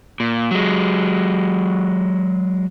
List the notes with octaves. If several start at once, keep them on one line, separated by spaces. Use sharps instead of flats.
A#2
F#3 G#3